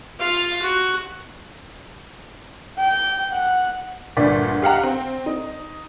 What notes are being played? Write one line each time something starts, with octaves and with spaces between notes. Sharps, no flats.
F4 F5
F#4
G5
F#5
G1 D2 A#2 D5 B6
G4 F5 F#5 A#5
C4
D#4